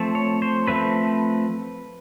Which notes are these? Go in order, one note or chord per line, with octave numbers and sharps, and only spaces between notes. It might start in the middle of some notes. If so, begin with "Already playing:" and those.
Already playing: F3 A3 C4
C#5
C5
F3 A3 C4 B4